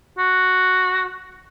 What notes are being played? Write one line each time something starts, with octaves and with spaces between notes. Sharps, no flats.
F#4